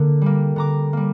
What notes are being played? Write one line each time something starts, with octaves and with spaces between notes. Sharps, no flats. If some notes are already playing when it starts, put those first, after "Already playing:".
Already playing: D3 A#3
G3 A#3
D3 A#5 D6
G3 A#3